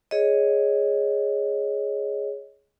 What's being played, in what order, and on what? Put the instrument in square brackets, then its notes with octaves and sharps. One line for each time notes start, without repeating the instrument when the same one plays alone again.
[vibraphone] G#4 C#5 D#5